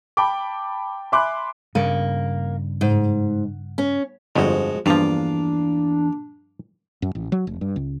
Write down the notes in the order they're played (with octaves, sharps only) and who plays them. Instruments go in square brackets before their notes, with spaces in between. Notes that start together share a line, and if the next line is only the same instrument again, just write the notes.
[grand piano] G5 A5 B5 D6
E5 G#5 B5 C6 D6 F#6
[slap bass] G2 C#3 [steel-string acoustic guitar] A#3
[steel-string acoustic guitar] G#2
C#4
[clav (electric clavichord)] G1 F2 [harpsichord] F3 G#3 F#4
[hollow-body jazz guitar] E2 [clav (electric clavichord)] G2 F3 [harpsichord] A#3 F4 F5 [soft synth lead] D4
[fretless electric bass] F#2
A1
F#3
F1
G2
C#2